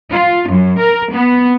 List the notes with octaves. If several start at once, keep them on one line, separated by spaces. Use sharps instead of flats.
F4
F#2
A#4
B3